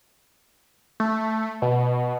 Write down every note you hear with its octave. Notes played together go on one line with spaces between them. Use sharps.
A3
B2